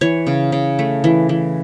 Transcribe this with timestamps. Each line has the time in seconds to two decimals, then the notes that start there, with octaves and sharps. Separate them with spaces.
0.01 E3 C#5
0.27 C#3
0.52 C#3
0.79 A3
1.04 E3
1.29 E3